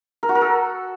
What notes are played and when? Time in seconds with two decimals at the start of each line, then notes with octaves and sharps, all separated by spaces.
0.23 A#4
0.29 F#4
0.35 A#4
0.41 A4